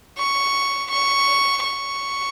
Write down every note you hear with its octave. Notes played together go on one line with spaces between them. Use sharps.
C#6
C#6
C#6